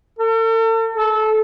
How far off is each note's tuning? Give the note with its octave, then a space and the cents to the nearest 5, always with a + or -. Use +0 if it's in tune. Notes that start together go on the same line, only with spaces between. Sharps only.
A4 +45
A4 -20